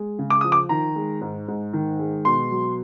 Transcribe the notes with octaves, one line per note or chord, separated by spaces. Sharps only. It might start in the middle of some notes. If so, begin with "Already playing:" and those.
Already playing: G#3
C#3
D6
F3 D#6
D6
D#3 A#5
G#3
G#2
G#2
D#3
G#3
B2 C6
F#3